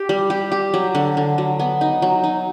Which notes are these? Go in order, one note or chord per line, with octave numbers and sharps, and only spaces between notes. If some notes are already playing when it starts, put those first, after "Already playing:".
Already playing: G4
G3
G4
G4
F#3
D3
D3
F#3
B3
D#4
F#3
D#4